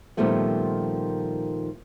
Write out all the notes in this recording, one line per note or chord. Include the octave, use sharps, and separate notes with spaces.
A#2 D#3 F3 G3 A3 B3